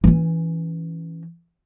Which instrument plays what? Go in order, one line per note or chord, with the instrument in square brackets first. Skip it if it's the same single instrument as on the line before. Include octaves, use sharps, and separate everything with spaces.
[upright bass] E3 C#4